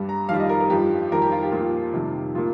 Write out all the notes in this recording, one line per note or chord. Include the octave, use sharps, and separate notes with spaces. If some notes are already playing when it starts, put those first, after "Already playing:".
Already playing: G2 G3
A#5
F2 D#3 G3 F5
D#5
A#4
A#4
G2 F3 G4
F2 D#3 G3 A#4
G4
F4
G4
A#2 F3 F4
F2 C3 D#3 G3
A#2 F3 F4